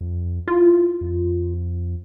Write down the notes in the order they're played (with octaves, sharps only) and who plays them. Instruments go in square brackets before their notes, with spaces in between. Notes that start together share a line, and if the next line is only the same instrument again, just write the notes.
[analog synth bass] F2
[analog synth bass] E4 [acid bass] F4
[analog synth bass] F2